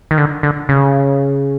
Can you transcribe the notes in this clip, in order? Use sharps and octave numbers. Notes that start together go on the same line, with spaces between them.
D#3
D3
D3
C#3